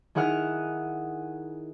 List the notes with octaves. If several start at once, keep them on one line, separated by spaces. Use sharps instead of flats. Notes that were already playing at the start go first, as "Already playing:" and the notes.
D#3 E4 G#4 F#5 F6